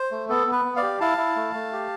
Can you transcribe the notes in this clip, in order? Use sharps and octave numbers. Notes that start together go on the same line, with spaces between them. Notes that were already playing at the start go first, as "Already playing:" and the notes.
Already playing: C5
A3
B3 A4
B3
B4
B3
D5 F5
G4
E4 F5 A5
E4
A3
A3
G4